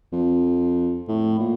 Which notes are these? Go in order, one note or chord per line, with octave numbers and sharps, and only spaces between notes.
F2
A2
A#2